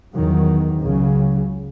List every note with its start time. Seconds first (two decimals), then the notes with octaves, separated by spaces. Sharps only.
0.15 E2 D#3 F#3
0.83 C#2 C#3 F#3